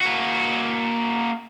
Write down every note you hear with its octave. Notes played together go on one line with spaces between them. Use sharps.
A#3 F#4